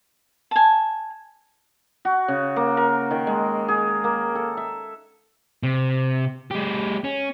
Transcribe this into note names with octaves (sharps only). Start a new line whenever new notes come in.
G#5 A5
F#4
C#3
A#3
A#4
D#3
G#3
G#4
A#3
A4
E5
C3
G#3 G4
C#4